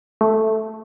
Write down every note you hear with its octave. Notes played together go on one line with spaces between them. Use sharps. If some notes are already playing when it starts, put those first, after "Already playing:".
A3